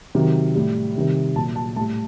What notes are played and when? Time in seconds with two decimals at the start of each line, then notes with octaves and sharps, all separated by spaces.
0.15 C3 D#3 F#3
0.55 A2 G3
0.96 C3 D#3 G3
1.36 A#2 F#3 A5
1.56 A5
1.76 A2 G3 A5